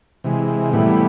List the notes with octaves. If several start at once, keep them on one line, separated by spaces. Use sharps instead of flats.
C3 E3 G#3
A2 E3 G3 B3